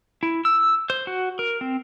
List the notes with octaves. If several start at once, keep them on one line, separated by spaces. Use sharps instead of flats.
E4
E6
C5
F#4
A#4
C4